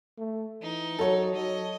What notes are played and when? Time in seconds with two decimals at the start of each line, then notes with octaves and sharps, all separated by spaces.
0.18 A3
0.62 E3 D#4
0.99 F#3 A4 C#5
1.35 F#3 D#5